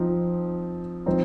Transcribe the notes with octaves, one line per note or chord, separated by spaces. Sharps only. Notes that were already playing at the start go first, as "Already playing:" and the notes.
Already playing: F3 C4 D#4
F3 C4 D#4